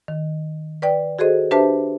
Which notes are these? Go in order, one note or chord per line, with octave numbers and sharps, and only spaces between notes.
D#3
B4 D5 G5
F#4 G#4 A4 C5 D#5
D4 G4 B4 C5 E5 A5